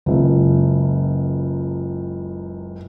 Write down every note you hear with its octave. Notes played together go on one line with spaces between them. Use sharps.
F#1 C#2